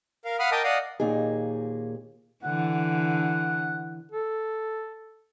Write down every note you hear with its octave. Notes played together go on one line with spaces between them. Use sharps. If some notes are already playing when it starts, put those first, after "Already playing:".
A#4 F5
F5 F#5 B5 D#6 F6
A#4 D#5 G5 A5 D6 D#6
D5 D#5 F5 F#5 D#6
D#2 A#2 D#4 G#4
D3 E3 F#5
A4